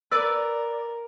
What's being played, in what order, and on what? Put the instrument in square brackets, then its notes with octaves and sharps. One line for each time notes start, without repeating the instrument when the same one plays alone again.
[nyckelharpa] A#4 [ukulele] B4 [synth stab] D5 [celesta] E6